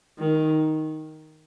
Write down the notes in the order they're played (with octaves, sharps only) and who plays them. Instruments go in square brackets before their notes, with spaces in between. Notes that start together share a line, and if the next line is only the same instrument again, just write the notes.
[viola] D#3